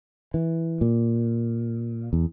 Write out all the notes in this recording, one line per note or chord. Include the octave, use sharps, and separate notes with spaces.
E3
A#2
E2